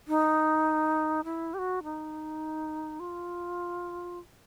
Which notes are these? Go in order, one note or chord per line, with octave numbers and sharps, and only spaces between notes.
D#4
E4
G4
F#4
D#4
F4